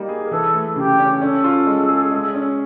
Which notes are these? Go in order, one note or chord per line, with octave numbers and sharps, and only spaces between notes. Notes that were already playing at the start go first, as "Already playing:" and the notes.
Already playing: G3 A#3 D#4
G#4
A#4
E3 A4
A3
C#3 G4
C#4
C#4 A4
F4
G#3
G#4
G#3
C#4